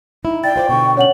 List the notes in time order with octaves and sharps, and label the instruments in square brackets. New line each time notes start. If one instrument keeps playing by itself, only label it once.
[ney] D#4 [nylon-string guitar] E4
[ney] D5 [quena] G5 [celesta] A6
[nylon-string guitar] F4 B4 D5 [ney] C5
[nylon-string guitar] B2 D3 [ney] C#6
[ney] C#4 [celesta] C#5 F#5 F#7